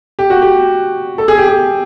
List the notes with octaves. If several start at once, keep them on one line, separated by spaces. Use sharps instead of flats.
G4
F#4
G4
A4
G#4
G4
G#4